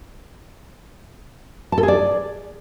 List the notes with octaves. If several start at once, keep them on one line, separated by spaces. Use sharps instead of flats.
A5
A4
G#4
D5